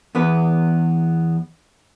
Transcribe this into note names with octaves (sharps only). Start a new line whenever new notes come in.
E2 B3 B4